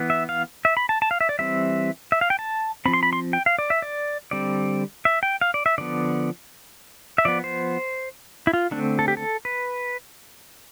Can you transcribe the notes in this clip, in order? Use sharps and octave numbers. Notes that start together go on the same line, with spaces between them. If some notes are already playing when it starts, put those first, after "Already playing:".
Already playing: E3 B3
E5
F5
E5
B5
A5
A5
F5
E5
D5
E3 G3 C4 E5
E5
F5
G5
A5
F3 C4 B5
C6
B5
C6
G5
F5
D5
E5
D5
D3 G3 C4 D5
E5
G5
F5
D5
E5
D3 F3 B3 D5
E5
F3 B3 D5
C5
E4
F4
D3 A3 C4 D4
A4
G4
A4
B4